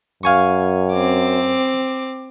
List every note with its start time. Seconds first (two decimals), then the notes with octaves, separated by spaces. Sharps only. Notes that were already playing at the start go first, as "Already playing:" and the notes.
0.23 F#2 F5 G#5 C#6
0.93 C4 D6